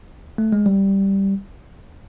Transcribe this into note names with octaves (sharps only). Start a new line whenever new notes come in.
A3
G#3
G3